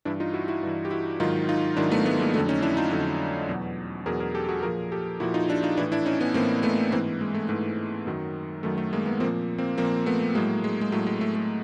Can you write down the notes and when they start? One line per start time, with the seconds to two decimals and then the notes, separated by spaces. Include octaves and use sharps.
0.05 G2 E3 D4 E4
0.20 D#4 F4
0.34 E4 F#4
0.48 E4 F#4
0.63 G2 E3
0.85 G4
0.91 E4 F#4
1.20 G#2 D#3 F#3 D#4 F4
1.49 D#4 F4
1.77 G#2 D#3 F#3 D4 E4
1.91 A3 B3
2.06 A3 B3
2.20 G#3 A#3
2.34 F2 D3 F#3 A3
2.49 C#4 D#4
2.62 D4 E4
2.77 D#4 F4
2.91 F2 D3 F#3
3.49 E2 B2 F#3
4.06 E2 B2 F#3 G#4 A#4
4.20 G#4 A#4
4.35 G4 A4
4.49 F#4 G#4
4.63 F3 G#4 A#4
4.68 A#2
4.92 G4 A4
5.20 A#2 E4 F#4
5.23 F3
5.34 D#4 F4
5.49 D4 E4
5.64 D#4 F4
5.77 E3 D4 E4
5.81 A2
5.92 D4 E4
6.06 C#4 D#4
6.20 B3 C#4
6.34 A2 E3 A#3 C4
6.63 A3 B3
6.92 G#2 E3 A#3 C4
7.21 G#3
7.34 A3
7.49 G#2 E3 A3
8.07 F#2 D#3 F#3
8.63 F#2 D#3 F#3 A3
8.78 A3
8.93 G#3 A#3
9.06 A3 B3
9.20 F3 A#3 C4
9.24 A#2
9.58 A#3 C4
9.78 A#2 F3 A#3 C4
10.06 A3 B3
10.35 A2 F#3 G#3 A#3
10.64 G#3
10.81 G#3
10.92 A2 F#3 A3
11.07 G#3
11.21 A3
11.35 A3